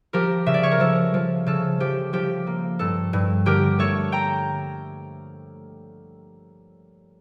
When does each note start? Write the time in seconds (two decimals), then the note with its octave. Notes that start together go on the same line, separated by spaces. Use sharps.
0.13 F3 G4 A#4
0.46 C#3 E5
0.54 D5
0.63 C#5
0.71 A#4
0.80 F3 A4
1.14 F3
1.46 C#3 A4
1.80 F3 G4
2.13 F3 G4
2.47 A#3
2.79 G2 A4
3.13 G2
3.46 D3 G4 A#4
3.79 A3 A4 C#5
4.12 G5 A#5